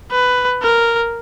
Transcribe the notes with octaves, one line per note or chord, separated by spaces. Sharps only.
B4
A#4